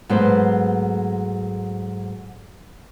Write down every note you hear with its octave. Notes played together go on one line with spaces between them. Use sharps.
G#2 F#3 A3 B3 C5